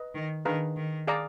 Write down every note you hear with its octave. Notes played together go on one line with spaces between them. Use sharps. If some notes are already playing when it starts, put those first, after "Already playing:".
Already playing: B4 D#5
D#3
D#3 D4 G#4 B4 F5 A#5
D#3
G#4 D5 F5 A#5